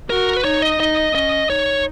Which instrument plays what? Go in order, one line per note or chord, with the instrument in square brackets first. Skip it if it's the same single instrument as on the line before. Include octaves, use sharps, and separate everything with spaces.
[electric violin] F#4 [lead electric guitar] A#4
[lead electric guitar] B4
[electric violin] D#4 [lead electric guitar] C#5
[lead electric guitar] D#5
[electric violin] D#4 [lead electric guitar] D#5
[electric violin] C#4 [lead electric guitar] D#5
[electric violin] D#4 [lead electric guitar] C#5